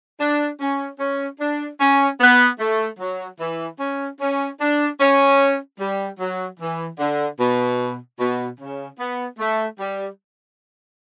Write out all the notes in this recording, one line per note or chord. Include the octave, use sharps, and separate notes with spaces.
D4
C#4
C#4
D4
C#4
B3
A3
F#3
E3
C#4
C#4
D4
C#4
G3
F#3
E3
D3
B2
B2
C#3
B3
A3
G3